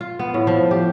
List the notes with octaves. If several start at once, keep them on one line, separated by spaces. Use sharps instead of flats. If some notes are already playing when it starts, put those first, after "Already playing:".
F4
B3
A2
F3
G4